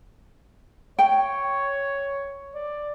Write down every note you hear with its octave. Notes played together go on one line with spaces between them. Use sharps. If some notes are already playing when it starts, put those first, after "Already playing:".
C#5 G5
D5